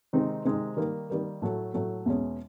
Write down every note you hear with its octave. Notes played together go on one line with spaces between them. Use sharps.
C3 D#3 G#3 C4 D#4
C3 D#3 G#3 C4 D#4
D#3 G3 A#3
D#3 G3 A#3
A2 F#3 A3
A2 F#3 A3
E2 B2 G#3 C#4